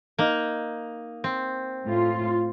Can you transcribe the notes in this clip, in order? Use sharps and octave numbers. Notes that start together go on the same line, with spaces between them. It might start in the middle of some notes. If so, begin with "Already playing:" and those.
A#3 D#4
C4
A2 F4